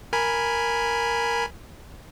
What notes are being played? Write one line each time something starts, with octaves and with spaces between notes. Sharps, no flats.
A#4 G#5 B5